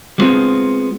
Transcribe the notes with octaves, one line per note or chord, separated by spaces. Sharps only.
G3 G#3 B3 C4 F4 G#4